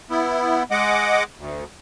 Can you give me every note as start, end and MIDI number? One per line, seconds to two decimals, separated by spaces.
0.10 0.63 59
0.10 0.63 64
0.71 1.23 56
0.71 1.23 75
0.71 1.23 78
0.71 1.23 86
1.38 1.64 38